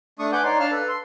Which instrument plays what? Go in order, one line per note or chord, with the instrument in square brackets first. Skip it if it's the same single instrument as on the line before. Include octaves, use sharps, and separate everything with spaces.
[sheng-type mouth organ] A3 D4 C#6 D#6
B4 F#5 G#5 D6 G6
D#4 C#5 D5 C6
D4 F5 A5 F6
A4 B4
C6